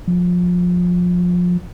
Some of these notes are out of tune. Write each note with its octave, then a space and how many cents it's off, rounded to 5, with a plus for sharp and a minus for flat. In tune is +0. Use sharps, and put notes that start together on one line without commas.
F3 +25